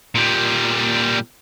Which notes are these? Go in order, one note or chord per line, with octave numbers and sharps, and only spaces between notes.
A#2 G3